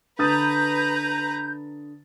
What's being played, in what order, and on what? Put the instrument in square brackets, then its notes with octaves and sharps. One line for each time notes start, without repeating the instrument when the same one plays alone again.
[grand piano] D3 D#6 A6 [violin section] B4 A#5 [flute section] G6